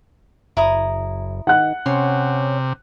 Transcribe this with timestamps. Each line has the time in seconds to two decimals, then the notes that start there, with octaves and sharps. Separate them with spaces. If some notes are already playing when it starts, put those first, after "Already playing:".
0.57 F#1 E4 A#5 D#6
1.47 D#3 F#5 F#6
1.86 C3 C#4 C#5 C6